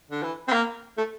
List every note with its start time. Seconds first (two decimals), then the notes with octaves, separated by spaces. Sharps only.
0.11 D3
0.23 E3
0.48 C4
0.52 A#3
0.97 A3